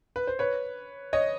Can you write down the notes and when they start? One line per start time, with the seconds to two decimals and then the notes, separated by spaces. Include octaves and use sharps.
0.16 B4
0.27 C5
0.39 B4 C#5
1.13 C#5 D#5